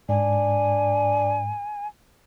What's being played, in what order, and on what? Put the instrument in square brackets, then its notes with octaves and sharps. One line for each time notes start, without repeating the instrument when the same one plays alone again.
[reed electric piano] G#2 [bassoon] D4 [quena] G#5